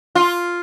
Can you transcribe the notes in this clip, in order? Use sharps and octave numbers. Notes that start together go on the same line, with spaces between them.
F4